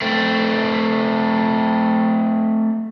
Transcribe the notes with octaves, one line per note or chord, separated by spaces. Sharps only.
A3 C4